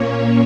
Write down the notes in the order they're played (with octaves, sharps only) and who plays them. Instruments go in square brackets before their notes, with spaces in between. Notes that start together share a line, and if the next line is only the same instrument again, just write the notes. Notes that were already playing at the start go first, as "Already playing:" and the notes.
Already playing: [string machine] A#2 A#3 C#4 C#5